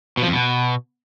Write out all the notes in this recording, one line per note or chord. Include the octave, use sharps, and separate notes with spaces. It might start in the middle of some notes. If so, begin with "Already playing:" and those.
B2
F3
F2
B2